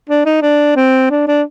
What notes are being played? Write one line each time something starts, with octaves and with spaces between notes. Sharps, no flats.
D4
D#4
D4
C4
D4
D4